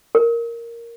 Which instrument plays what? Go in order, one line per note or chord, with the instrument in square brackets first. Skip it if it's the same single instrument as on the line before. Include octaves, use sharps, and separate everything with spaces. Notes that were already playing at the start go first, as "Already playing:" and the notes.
[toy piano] A#4